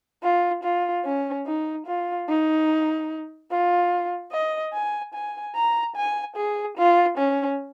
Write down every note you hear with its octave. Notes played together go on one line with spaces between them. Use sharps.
F4
F4
C#4
D#4
F4
D#4
F4
D#5
G#5
G#5
A#5
G#5
G#4
F4
C#4